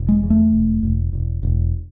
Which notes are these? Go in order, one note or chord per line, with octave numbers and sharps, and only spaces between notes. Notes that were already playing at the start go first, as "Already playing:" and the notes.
Already playing: E1
G#3
E2
A3
E1
E1
E1
E1